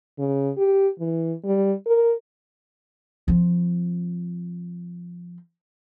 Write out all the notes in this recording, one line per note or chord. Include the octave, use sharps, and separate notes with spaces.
C#3
G4
E3
G3
A#4
F3 C4